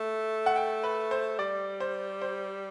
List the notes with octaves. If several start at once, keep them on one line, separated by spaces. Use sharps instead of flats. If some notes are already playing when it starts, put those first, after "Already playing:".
Already playing: A3
F#5
G5
B4
C5
G3 D5
C5
C5